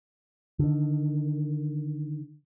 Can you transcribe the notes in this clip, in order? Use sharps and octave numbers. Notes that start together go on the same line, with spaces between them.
D3 D#3